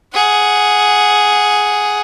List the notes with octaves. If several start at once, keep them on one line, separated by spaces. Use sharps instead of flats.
G#4 F#5